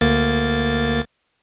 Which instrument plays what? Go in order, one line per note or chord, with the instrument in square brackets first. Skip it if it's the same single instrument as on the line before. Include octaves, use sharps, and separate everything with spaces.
[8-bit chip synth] D2 A#3 A6